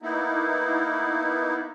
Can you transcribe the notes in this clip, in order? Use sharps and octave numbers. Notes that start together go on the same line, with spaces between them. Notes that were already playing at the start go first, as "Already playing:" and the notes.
A#3 B3 D#4 E4